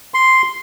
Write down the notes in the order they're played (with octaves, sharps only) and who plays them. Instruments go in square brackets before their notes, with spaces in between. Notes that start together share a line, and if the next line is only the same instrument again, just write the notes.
[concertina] C6